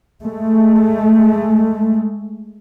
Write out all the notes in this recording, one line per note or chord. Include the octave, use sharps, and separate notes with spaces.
G#3 A3